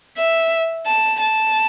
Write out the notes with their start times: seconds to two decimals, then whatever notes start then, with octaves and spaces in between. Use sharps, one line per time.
0.18 E5
0.87 A5
1.21 A5